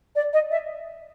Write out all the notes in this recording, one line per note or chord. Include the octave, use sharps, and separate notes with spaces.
D5
D#5
E5